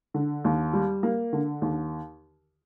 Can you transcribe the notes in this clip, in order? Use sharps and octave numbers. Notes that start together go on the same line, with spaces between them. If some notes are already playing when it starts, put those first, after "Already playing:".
D3
D#2
G3
A#3
D3
D#2